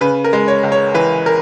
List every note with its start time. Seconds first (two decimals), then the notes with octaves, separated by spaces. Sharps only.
0.01 C#3 B4
0.24 A#4
0.33 G#3
0.48 C#5
0.63 C#2
0.72 C#5
0.94 E3 B4
1.26 A#4